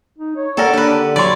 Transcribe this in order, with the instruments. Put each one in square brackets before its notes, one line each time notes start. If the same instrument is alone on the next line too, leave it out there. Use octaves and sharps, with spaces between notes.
[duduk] D#4
C#5
[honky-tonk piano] A#3 D5 F#5 [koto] A4 A#4
[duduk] D4 [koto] G4 B4
[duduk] D3
[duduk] F#3 [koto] C#5 D5 [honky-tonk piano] B5 C6